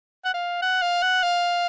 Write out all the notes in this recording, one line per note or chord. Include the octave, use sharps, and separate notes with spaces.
F#5
F5
F#5
F5
F#5
F5